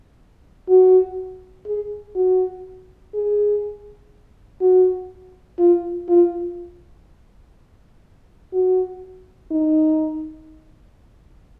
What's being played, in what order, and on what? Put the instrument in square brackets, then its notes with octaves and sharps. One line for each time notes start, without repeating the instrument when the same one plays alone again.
[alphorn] F#4
G#4
F#4
G#4
F#4
F4
F4
F#4
D#4